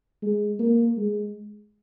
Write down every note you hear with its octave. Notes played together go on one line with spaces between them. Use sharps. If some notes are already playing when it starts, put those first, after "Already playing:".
G#3
A#3
G#3